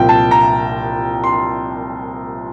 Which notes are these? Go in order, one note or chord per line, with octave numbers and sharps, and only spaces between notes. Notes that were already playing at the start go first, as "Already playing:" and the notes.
Already playing: C2 A#2 F3 G5
A5
A#5
C6